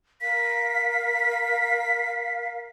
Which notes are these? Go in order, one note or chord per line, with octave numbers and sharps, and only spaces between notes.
A#4 F5 B6